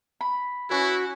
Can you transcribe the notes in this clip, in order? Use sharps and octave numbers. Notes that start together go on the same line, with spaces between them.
B5
C#4 E4 F#4 B4